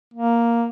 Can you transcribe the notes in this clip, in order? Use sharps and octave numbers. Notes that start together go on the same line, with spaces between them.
A#3